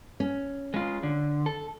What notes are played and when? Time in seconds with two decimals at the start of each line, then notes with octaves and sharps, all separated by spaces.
0.20 C#4
0.74 G#3 F4
1.03 D3
1.46 A4